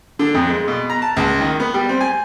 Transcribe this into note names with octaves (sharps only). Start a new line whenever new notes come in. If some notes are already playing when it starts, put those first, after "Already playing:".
D3
F2
G#3
B2
A#5
A5
C#2
D#3
B3
G3
C4
G#5